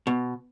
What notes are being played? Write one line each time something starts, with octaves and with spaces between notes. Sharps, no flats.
B2